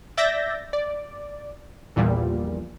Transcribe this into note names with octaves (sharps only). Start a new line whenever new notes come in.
D5 E5 G6 A6 A#6
D5
A#1 E2 A#2 G3